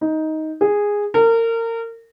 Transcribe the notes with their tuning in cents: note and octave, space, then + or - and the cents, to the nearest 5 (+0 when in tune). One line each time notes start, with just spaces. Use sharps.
D#4 +10
G#4 -10
A#4 -30